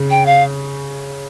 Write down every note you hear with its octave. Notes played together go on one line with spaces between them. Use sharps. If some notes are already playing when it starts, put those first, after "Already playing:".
Already playing: C#3
G5
F5